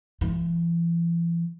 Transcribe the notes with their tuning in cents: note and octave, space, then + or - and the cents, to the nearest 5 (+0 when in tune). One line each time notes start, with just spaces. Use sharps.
E3 +40